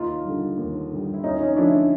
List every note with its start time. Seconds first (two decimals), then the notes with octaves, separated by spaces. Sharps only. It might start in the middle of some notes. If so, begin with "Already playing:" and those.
Already playing: D#2 D#4 F4
0.24 D3 G3
0.57 D#2
0.91 D3 G3
1.14 E4
1.23 D#2 C#4 D#4
1.40 C#4 D#4
1.56 D3 F3 A3 D4 E4